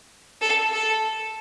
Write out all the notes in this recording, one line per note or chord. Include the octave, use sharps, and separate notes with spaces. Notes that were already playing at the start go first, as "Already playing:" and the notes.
A4
A4